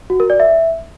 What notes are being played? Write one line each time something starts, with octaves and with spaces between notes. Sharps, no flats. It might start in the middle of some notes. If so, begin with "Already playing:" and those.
F#4
A#4
D5
E5